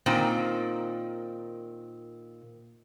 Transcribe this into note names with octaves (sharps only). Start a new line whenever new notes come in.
A#2 D#3 C4